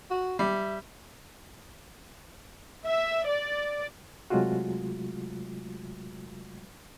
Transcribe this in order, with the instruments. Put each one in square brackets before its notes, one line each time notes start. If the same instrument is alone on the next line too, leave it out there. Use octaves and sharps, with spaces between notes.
[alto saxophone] F#4
[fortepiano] G3 [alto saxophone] E5
[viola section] E5
D5
[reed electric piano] C3 F#3 G#3 A3 F4 F#4